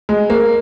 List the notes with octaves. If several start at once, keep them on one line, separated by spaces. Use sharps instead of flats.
G#3
A#3